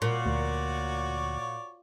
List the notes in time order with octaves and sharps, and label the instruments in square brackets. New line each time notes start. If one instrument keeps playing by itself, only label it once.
[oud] A#2 [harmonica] F#4 C#5 D5
[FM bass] D2